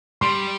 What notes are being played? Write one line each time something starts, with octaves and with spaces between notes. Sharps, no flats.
G3 C6